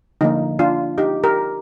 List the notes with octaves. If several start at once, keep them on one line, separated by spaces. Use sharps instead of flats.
D3 F3 A#3 D#4
D4 F4
D#4 G4
G4 A#4